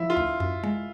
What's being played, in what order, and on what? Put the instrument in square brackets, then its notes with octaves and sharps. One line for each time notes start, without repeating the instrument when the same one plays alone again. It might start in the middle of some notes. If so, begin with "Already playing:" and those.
Already playing: [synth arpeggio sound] F3 [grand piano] E4
[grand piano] F4
[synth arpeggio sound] D2
F#2
G#3